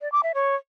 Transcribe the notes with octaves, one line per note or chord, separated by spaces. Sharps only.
D5
D6
E5
C#5